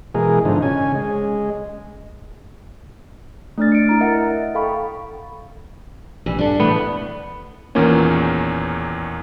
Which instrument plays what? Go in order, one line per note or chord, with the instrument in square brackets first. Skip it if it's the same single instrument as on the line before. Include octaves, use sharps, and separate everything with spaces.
[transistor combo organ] B2 E3 G#3 G#4 A#4
G#2 D3 F3 D#4
C#3 C#4 G#5
G#3
[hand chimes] A3 D4 D5 F6 A6
C#7 D7
E4 A#5 F6
A#4 D#5 E5 F#5
A4 F5 G5 B5 C#6
[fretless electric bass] A#1 [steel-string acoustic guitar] E3 G3
[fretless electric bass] G2 [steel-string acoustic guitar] D4 A4
[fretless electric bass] A2 E3 A3 [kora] B3
[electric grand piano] E2 A#2 D#3 A#3 C#4